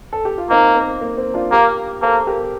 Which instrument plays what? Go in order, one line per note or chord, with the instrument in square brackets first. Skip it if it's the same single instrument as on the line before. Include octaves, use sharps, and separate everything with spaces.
[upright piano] A4
G4
F4
[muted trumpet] A#3 [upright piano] C4 D#4
[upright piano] C4
A#3
C4
D4 F4
[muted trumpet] A#3 [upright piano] G4 A#4
[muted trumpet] A#3 [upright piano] A4 C5
[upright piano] G4 A#4